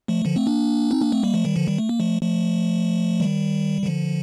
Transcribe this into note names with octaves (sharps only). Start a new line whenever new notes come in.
F3 A3
D3 F3
A3 C4
A#3 D4
C4 D#4
A#3 D4
A3 C4
G3 A#3
F3 A3
D#3 G3
D3 F3
D#3 G3
A3
A#3
F3 A3
F3 A3
D#3 G3
D#3
D3 F3